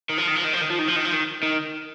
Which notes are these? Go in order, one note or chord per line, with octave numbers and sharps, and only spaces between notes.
D#3
F3
D#3
F3
D#3
F3
D#3
F3
D#3
F3
D#3
F3
D#3
D#3